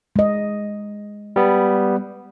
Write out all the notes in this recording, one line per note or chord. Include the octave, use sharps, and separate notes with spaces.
G#3 D#5
G3 B3